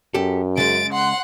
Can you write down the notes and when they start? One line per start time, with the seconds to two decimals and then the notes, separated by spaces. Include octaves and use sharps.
0.14 F#2 G4 A4
0.57 C#3 G#3 A6 D7
0.93 F#5 C6